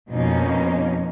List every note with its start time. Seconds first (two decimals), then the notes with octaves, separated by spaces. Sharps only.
0.12 F2 B2 A#3 C#4 D#4